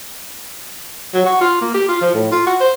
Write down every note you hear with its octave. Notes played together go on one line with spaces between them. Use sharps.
F#3
F#4
F4
A#3
G4
F4
F3
A2
F4
F#4
C5